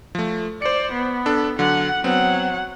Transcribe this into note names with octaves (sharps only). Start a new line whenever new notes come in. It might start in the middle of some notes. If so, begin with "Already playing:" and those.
F3 A3
C5 D5 C#7
B3
D4 A4
D3 F#3 F#5
F#3 B3 C4 F#5